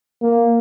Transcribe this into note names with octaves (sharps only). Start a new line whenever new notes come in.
A#3